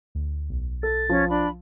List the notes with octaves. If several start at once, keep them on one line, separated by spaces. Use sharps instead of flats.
D2
B1
A4 A6
F3 C#4
D4 B5